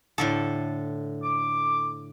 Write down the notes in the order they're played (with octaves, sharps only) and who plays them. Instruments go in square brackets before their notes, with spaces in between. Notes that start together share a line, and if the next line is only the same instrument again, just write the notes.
[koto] A2 D3 A4
[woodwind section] D6